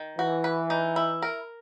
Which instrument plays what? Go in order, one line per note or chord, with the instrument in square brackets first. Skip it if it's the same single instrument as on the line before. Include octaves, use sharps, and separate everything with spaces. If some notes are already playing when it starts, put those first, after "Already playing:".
Already playing: [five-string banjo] D#3
[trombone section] E3 [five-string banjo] F#4
[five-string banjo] B4
D#4
E4
A#4